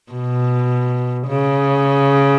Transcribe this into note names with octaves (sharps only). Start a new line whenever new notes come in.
B2
C#3